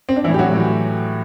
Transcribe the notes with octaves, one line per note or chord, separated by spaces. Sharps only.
C4
D4
E3 E4
A2
G4
F#3 F#4
A2 E3